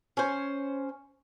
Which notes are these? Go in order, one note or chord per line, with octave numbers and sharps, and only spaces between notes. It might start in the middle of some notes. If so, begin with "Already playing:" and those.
C#4 C5